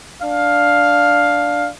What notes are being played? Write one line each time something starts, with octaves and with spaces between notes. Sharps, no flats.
D4 F5